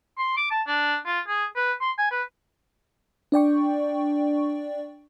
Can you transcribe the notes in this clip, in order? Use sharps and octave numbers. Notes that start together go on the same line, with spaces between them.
C6
D6
A5
D4
F4
G#4
B4
C6
G#5
B4
D4 D5 G5 C#6